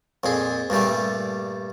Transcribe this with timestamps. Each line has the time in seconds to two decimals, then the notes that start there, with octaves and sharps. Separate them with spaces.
0.24 F2 A#2 G#4
0.70 G2 A#2 G3 A3